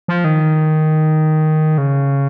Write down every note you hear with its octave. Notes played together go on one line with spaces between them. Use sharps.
F3
D#3
C#3